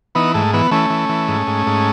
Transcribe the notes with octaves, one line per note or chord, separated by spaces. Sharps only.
E3 B3 D#4
G#2 A3
E3 B3
E3 A3 C#4
E3
E3
G#2
G#2
G#2